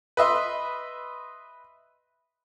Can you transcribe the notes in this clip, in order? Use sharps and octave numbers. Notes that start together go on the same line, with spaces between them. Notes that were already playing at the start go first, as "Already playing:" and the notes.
B4 D#5 E5 C6